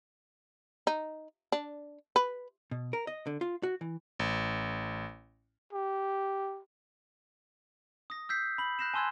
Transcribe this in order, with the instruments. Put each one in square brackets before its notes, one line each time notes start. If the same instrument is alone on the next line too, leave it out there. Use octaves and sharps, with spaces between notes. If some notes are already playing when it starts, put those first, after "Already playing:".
[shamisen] D#4
D4
B4
[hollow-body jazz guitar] B2
A#4
D#5
D3
F4
F#4
E3
[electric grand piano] A1
[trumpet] G4
[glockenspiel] D#6 A#6
E6 G6 B6 C7
B5 F#7
F#6 G6 A#6 C7 E7
G#5 A5 C6 E6 F#6 G#6